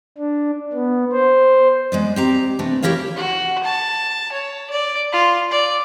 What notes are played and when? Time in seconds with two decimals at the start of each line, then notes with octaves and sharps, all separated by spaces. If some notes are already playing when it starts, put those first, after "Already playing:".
0.18 D4
0.73 B3
1.13 C5
1.92 G#3 B3 D5
2.16 C4 G4 A#5
2.59 C3 A3 B3 D4
2.83 E4 G4 A#4 C#5 F5
3.16 F#4
3.64 A5
4.32 C#5
4.70 D5
5.12 F4
5.51 D5